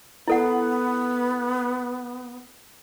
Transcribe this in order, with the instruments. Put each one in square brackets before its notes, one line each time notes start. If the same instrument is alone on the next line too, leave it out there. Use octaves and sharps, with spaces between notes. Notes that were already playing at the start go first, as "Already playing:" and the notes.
[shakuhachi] B3 [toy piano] E4 A4 F#5